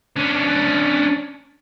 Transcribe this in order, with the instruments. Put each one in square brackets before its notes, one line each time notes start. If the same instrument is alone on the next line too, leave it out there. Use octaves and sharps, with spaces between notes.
[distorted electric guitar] C#4 D4